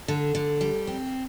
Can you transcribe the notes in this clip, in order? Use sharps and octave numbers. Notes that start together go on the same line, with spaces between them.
D3
D3
G3
C4